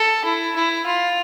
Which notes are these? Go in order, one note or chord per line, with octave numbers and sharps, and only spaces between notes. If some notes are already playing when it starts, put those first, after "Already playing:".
Already playing: A4
E4
E4
F4